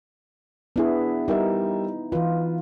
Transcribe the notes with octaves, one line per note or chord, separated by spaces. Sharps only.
B3 D4 E4 G#4
G3 D#4 A#4 E5
E3 F4 B4